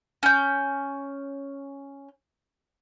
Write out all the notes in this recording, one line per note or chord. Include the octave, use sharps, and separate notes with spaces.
C#4 G6